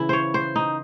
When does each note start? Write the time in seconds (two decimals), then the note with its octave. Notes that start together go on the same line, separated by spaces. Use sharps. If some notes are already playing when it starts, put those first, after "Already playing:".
Already playing: C#3 E3 E4
0.09 C5 C#5
0.34 C5
0.56 D#4